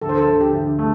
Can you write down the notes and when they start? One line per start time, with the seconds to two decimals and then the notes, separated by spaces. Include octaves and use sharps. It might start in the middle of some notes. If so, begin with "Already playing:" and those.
0.02 D2 A4
0.09 C5
0.18 A4
0.27 D2
0.41 G4
0.53 D2
0.79 A3